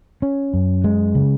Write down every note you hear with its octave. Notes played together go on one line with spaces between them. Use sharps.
C#4
F#2
G#3
C#3